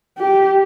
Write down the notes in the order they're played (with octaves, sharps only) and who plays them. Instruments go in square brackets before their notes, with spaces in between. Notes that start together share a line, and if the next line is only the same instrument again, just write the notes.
[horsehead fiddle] G4